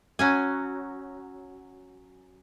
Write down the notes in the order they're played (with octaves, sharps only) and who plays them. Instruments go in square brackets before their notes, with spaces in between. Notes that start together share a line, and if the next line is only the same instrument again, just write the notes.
[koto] F#3 C#4 G#5